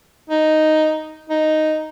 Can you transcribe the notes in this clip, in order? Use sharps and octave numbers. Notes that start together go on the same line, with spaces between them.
D#4
D#4